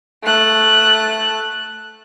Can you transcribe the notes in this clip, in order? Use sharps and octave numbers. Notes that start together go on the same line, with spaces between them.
A3 F#6